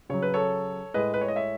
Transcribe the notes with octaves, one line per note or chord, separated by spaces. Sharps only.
C#3 F#3 C#5
B4
A4 C#5
A2 G#3 B4 D#5
B4
C#5
D#5
C#5 E5